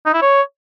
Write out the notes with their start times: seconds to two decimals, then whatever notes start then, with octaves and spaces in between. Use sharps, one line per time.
0.06 D#4
0.14 E4
0.22 C#5